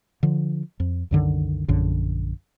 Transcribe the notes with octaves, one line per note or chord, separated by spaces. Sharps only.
D3 F3
F2
C2 F#2 D3 D#3
A#1 F#2 D3